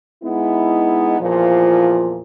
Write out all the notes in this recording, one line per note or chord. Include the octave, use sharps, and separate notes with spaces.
G#3 B3 D#4 E4
E2 A#2 F3